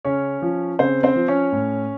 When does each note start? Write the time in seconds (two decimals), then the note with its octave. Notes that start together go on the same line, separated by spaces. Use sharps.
0.05 C#3 C#4 C#5
0.42 F3
0.79 C#3 C4 C5
1.03 C4 C5
1.15 F3
1.28 C#4 C#5
1.52 A2